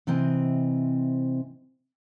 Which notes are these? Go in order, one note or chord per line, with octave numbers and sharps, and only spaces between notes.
C3 E3 C4 D#5